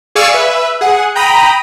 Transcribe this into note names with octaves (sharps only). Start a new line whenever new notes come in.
G#4 D5 F5 G#5 C#6 E6
B4 E5
G#4 F#5
G5 A#5 B5 D#6